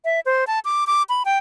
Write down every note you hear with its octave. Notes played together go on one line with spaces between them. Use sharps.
E5
C5
A5
D6
D6
B5
G5